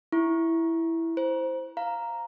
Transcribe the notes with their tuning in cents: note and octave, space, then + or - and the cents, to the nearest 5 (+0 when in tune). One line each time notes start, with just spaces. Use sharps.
E4 +0 C#6 -10
C5 +0 A#5 +35
F5 +0 A#5 +0